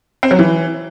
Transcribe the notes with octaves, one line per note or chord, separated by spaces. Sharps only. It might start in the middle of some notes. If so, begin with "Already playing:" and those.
C4
F#3
E3